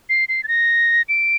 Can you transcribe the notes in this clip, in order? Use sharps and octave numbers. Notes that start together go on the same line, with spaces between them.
C7
C7
A6
A#6
D7